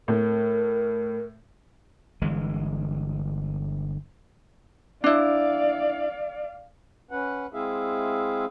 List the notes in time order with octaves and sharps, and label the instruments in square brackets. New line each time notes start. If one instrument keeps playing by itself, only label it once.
[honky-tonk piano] A2 [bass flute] A#4
[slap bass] G1 E3 G#3
[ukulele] D4 E4 [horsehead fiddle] D5 F5
[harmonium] C#4 B4 F#5
G#3 C4 E4 G#4 E5 F5